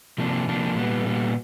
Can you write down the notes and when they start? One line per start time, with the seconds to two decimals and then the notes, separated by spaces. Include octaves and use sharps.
0.18 C3 F3 A#3 D4
0.48 C3 F3 A#3 D4
0.76 A#2 G3 B3
1.05 A#2 G3 B3